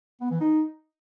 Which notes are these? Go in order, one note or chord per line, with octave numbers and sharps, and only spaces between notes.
B3
E3
D#4